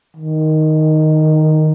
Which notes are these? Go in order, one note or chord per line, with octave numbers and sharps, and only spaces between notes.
D#3